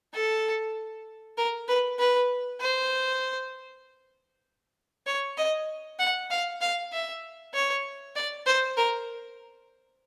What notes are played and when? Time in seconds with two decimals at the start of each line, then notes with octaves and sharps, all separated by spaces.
0.13 A4
1.37 A#4
1.68 B4
1.99 B4
2.60 C5
5.07 C#5
5.37 D#5
5.99 F#5
6.30 F5
6.61 F5
6.92 E5
7.54 C#5
8.15 D5
8.46 C5
8.77 A#4